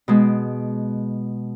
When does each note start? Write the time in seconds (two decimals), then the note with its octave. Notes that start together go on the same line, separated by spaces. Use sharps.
0.08 B2 G#3